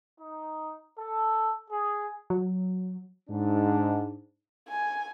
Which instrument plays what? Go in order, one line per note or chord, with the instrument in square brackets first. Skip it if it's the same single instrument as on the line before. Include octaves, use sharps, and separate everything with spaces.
[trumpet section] D#4
A4
G#4
[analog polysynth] F#3
[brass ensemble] G#2 D4
[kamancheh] G#5